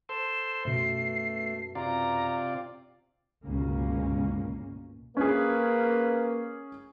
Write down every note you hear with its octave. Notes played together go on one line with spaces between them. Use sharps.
A4 C5 C6 E7
F#2 B2 A3 C7
C3 F4 D5 A#5
G1 C#2 B2 A#3 C#4
A#3 C#4 G#4 B4